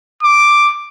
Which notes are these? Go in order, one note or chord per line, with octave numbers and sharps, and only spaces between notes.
D6